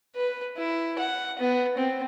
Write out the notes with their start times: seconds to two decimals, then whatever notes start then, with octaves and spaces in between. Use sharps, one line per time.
0.15 B4
0.57 E4
0.99 F#5
1.39 B3
1.77 C4